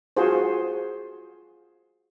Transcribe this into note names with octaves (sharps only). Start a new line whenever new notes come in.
F4 F#4 G#4 C5